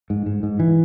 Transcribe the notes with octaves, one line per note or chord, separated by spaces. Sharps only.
G#2
G#2
G#2
E3